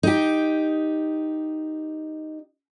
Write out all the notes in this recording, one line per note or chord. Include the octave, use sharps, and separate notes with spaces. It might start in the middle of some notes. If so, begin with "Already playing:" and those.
D#4 G4